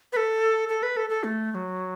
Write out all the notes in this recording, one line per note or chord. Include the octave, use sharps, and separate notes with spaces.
B4
A4
A4
B4
A4
A4
A3
A3
F#3